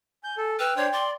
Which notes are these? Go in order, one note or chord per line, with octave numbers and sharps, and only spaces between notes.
G#5 G6
A4
B4 G5 E6 F6
D4 C5 C#5
D5 C6